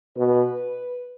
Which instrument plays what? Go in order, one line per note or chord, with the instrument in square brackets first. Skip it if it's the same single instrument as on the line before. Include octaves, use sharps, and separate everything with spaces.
[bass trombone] B2 [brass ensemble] B4